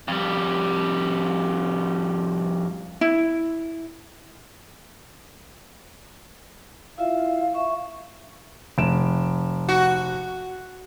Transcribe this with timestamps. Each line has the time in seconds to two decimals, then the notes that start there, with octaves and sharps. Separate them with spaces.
0.08 F2 G3
3.01 E4
6.98 E4 F4 E5 F5
7.54 E5 C#6
8.78 F1 D7 E7
9.69 F#4